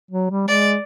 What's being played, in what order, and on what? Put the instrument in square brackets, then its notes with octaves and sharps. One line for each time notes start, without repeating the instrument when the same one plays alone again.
[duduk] F#3
G3
[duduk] G#3 [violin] D5